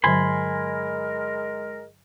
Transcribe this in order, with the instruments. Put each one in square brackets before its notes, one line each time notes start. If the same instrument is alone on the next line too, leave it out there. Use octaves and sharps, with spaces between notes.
[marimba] G2 D3 F#3 [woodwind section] G#3 A#4 [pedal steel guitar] G#5 B5 C6